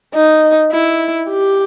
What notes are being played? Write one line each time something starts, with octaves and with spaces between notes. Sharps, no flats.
D#4
E4
G4